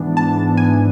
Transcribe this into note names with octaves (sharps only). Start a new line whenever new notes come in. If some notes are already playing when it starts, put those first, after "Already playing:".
Already playing: G#2 E3 B3 D4
A5
G#5